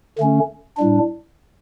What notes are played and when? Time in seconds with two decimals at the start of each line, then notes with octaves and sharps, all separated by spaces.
0.18 D3 A3 C#4
0.78 A2 G3 D4